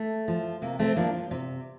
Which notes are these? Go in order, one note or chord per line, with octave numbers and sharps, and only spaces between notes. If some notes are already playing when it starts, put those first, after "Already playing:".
Already playing: A3
F3
C3 A#3
A3 C4
F3 A#3 D4
C3